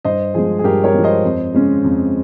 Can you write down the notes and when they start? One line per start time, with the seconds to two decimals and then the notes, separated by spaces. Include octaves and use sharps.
0.05 G2 C5 D#5
0.34 F3 G#3 G#4
0.59 G#4
0.64 G2 G4 A#4
0.84 A#4 C#5
0.94 F3 G#3
1.04 C5 D#5
1.24 F2
1.54 C#3 G#3 C#4
1.84 F2